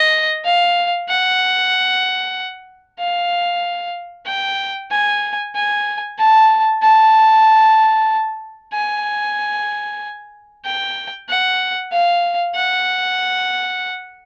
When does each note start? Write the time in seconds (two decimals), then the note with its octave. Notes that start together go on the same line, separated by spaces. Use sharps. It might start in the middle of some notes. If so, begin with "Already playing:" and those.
Already playing: D#5
0.44 F5
1.08 F#5
2.99 F5
4.27 G5
4.91 G#5
5.55 G#5
6.18 A5
6.82 A5
8.73 G#5
10.65 G5
11.28 F#5
11.92 F5
12.55 F#5